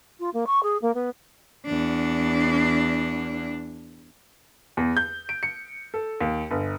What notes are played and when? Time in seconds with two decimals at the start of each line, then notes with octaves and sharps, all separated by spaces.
0.19 F4
0.33 A#3
0.47 C#6
0.63 G#4
0.82 A#3
0.94 B3
1.66 E2 D4
4.77 E2
4.97 G6
5.29 D7
5.43 C#7
5.94 A4
6.21 D#2
6.51 G1